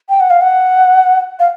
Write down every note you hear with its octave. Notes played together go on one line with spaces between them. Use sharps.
G5
F#5
F5
F#5
F5